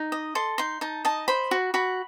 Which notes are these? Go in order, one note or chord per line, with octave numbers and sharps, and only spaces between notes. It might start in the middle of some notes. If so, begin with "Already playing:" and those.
Already playing: D#4
D#5
A4 C6
D#4 C6
D#4 A5
D#5 A5
C5 B5
F#4
F#4 B5